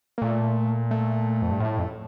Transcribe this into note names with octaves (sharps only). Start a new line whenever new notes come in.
A#3
A#2 A3
A3
F2
G2
A2
F2